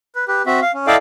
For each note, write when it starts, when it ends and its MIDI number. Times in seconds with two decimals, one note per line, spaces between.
0.16 0.25 71
0.28 0.42 67
0.28 0.42 71
0.46 0.60 60
0.46 0.60 66
0.46 0.60 76
0.62 0.71 77
0.74 0.87 61
0.87 0.96 64
0.87 0.96 69
0.87 0.96 74
0.87 0.96 75
0.87 0.96 77
0.87 0.96 79